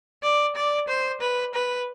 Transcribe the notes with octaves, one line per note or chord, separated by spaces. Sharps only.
D5
D5
C5
B4
B4